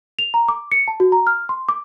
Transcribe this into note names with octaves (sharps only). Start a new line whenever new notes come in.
F7
A#5
D6
C#7
A5
F#4
A#5
F6
C6
D6